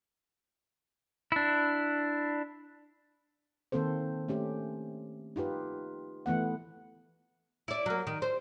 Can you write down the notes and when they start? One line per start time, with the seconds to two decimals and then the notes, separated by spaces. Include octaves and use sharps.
1.32 D4 E4
3.72 D#3 A#3 C4 A4 C5
4.28 A3 C#4 G4
5.36 D#4 F4 G4 B4
6.26 E3 A3 B3 F#5
7.68 E4 D5
7.86 F#3 A#3
8.07 D#3
8.22 C5